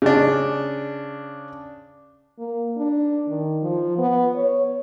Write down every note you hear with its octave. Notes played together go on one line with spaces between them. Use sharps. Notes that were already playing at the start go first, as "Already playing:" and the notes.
C#3 D4
A#3
D4
D#3
F3
B3
C#5